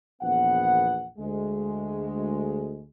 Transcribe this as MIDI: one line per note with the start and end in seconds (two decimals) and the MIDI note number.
0.22 1.06 34
0.22 1.06 40
0.22 1.06 59
0.22 1.06 78
1.19 2.85 38
1.19 2.85 56